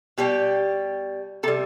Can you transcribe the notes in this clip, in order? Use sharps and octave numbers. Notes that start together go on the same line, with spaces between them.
B2 G3 G4
C3 G3 A4